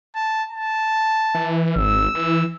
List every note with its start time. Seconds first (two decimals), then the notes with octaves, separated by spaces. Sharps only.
0.16 A5
0.51 A5
1.35 E3
1.76 G#1 E6
2.15 E3